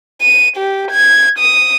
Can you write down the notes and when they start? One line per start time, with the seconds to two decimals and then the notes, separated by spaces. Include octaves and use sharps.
0.21 D#7
0.57 G4
0.91 G#6
1.38 D#6